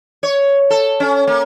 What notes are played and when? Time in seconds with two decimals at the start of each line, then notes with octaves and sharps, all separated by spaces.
0.23 C#5
0.70 A4
1.00 C#4
1.27 A#3